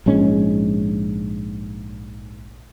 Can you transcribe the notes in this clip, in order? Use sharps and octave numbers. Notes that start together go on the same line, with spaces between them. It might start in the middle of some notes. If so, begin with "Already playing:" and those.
A#1 G#2 G#3 C#4